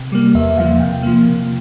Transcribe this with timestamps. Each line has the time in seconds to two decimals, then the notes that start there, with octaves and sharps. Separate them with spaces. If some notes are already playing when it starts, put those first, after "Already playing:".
Already playing: C3
0.12 G3 A#3
0.35 E2 E5
0.57 C#3 F3 A#3 F5
0.80 C3 G5
1.03 F3 A#3
1.25 C3